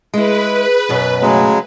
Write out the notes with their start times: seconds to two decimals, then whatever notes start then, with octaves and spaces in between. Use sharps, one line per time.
0.14 G#3 E4 G#4 B4
0.89 F#2 B2 B3
1.22 C#3 F#3 G#3 A3